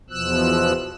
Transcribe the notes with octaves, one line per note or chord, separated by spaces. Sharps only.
E2 B2 F3 E6 F#6